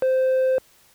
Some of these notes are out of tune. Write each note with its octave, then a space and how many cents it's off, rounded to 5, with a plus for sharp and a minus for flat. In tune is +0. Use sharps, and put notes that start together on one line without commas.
C5 -10